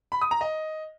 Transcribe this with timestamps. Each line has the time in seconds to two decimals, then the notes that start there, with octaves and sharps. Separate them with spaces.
0.12 B5
0.21 D#6
0.31 A#5
0.41 D#5